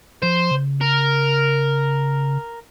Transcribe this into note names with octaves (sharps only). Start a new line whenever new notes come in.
F3 C5
C#3
A#4